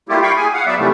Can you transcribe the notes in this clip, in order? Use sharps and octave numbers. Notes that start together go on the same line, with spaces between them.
G3 A3 A#3 E4 F4 G4
F5 G5 B5 C#6
G#4 G#5
F5 F#5
F#3 B3 D5 E5
C3 D#3 E3 G3 A3